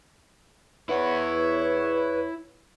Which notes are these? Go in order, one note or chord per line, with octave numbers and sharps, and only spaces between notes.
E2 E4 B4 C#5 F#5